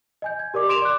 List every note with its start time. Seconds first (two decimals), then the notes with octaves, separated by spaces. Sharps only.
0.22 D#5 G#5 G6
0.39 G#6
0.54 G4 A#4 D5 D6
0.69 C6 D7 E7 F7
0.82 D5 D6 F#6